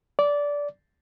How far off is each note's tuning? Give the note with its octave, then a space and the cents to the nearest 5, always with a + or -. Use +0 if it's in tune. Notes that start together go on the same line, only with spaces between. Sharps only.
D5 -15